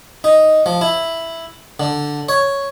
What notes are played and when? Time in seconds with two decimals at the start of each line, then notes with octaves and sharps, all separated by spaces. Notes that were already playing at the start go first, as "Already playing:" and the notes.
0.24 D#4
0.66 F3
0.81 E4
1.80 D3
2.29 C#5